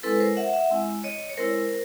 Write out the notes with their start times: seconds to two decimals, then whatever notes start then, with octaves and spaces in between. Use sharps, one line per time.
0.03 G#3 C4 E4 A4 B4
0.20 A#4 C5
0.37 E5 F#5
0.53 E5 F#5
0.70 G#3 C4 E4
1.04 C#5 D#5
1.29 C#5
1.37 G#3 C4 E4 A#4 C5